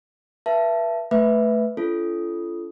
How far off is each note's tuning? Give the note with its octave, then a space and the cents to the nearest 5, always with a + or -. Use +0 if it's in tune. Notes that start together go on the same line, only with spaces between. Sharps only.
B4 -35 E5 +25 A5 +0
A3 +0 B4 +0 E5 +0
C#4 +40 F4 -35 A4 -15